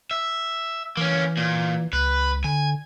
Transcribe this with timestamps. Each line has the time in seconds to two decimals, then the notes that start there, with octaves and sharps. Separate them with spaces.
0.11 E5
0.97 E3 A#3 C#4
1.37 A#2
1.93 C#2 B4
2.44 D3 G#5